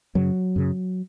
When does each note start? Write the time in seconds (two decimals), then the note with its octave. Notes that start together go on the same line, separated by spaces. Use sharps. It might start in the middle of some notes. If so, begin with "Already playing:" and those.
0.15 F#2 C#3 F#3
0.56 F#2 C#3